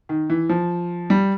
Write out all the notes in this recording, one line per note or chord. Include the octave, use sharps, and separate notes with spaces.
D#3
E3
F3
G3